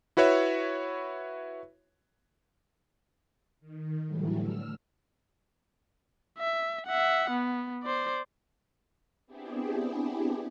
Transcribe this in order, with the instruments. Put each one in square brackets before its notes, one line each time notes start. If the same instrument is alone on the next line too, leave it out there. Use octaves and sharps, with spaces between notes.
[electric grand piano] E4 F#4 B4 C#5 E5
[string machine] D#3
A2 D3 E3 F#3 G3 A3
E6 F6
[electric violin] E5
E5 F#5
B3
C5 D5
[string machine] B3 C4 D4 E4 G4 G#4